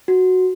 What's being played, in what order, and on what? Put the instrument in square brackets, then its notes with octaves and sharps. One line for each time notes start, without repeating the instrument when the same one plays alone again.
[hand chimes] F#4